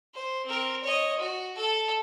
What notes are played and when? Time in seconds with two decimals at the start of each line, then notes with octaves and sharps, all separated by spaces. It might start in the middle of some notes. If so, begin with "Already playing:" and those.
0.14 C5
0.46 C4 A#4
0.83 C#5 D#5
1.19 F#4
1.56 A4 A5